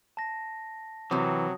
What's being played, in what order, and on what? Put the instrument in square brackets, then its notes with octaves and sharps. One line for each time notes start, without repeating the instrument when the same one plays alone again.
[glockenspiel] A5 A#6
[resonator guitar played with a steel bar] C3 C4 [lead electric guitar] E3 [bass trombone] F#3 [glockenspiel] D#6